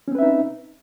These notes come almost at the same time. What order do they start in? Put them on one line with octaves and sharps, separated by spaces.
C#4 C4 B4 E5 D#4